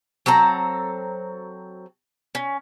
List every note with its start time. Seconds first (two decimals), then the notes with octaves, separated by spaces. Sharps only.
0.26 F#3 C4 A4 A#5
2.35 C#4